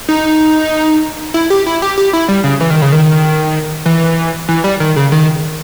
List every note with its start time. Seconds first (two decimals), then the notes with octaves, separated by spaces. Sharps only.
0.09 D#4
1.34 E4
1.50 G4
1.66 E4
1.82 G4
1.98 G4
2.13 E4
2.28 G3
2.44 C#3
2.61 E3
2.70 D#3
2.82 C#3
2.92 D#3
3.86 E3
4.48 E3
4.64 G3
4.80 D#3
4.96 C#3
5.12 D#3